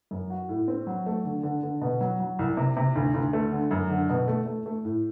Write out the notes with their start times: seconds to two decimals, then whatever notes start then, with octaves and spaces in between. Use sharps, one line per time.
0.11 F#2
0.30 F#4
0.49 A2
0.68 C4
0.87 F#3
1.06 A3
1.25 D3
1.43 D3
1.63 D3
1.82 B2
2.01 F#3
2.20 F#3
2.39 C2
2.57 C3
2.77 C3
2.96 D2
3.14 D2
3.33 A3
3.52 D3
3.71 F#2
3.90 D3
4.09 B2
4.28 A3
4.46 A3
4.66 A3
4.85 A2